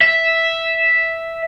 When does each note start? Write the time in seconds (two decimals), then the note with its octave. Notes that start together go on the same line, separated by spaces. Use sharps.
0.01 E5